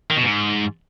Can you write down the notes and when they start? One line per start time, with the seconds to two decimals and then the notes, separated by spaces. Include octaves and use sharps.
0.11 D#3
0.17 B2
0.24 G#2